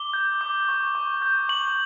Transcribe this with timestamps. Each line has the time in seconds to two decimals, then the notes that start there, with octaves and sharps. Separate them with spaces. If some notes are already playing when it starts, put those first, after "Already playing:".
Already playing: D6 G7
0.13 G6
0.41 D6
0.68 C#6
0.95 C#6
1.22 G6
1.49 C#6 F#7